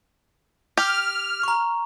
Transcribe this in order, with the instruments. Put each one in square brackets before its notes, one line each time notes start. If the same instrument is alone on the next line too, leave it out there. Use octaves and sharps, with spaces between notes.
[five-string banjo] G4 [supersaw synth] F6
[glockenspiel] A#5 C#6